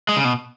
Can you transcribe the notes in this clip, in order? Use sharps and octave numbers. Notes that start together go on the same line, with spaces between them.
G#3
C#3
B2